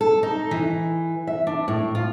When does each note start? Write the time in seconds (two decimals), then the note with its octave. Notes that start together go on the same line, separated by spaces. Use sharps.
0.01 A4
0.23 D#4
0.51 E3
1.27 E5
1.47 D4
1.68 A2
1.95 F4